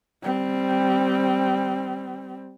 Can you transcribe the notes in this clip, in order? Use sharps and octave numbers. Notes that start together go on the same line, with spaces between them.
G3 C4